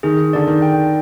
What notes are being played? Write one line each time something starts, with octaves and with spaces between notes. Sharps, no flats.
D#3 G#4
D3 D5
D#3
G5